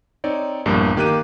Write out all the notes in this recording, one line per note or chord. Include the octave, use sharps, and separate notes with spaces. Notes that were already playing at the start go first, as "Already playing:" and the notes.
C4 D#4 C#5 D5
A#1 E2 G2 A#3
D#3 A#3 G4 D6 F#6 D#7